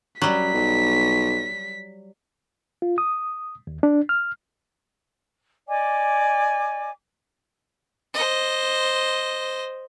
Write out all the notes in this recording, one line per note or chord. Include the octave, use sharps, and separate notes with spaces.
F#2 F#3 G3 B6
B1
F4
D#6
D#2
D4
F6
D5 D#5 G#5 D6
C5 D#5